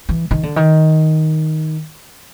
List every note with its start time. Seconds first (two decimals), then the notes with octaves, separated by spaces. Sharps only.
0.09 E3
0.31 D#3
0.43 D3
0.56 D#3